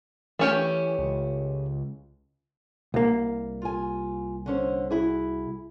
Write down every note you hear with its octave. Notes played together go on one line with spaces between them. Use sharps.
E3 A3 C#4 G4
C#2
C2 A#3
F4 G#5
D3 C#4 C5
E4 F#4 G#4